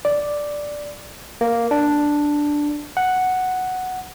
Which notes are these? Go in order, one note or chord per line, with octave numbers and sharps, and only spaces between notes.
D5
A#3
D4
F#5